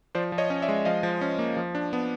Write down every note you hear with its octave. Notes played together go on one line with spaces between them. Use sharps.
F3 C5 D5
F3
C#5 D#5
C#4
D5 E5
G#3
F3 D#5 F5
F3
C#4
A#3
F3
D4
B3